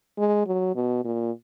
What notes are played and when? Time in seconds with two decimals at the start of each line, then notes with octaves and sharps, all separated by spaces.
0.18 G#3
0.46 F#3
0.75 B2
1.05 A#2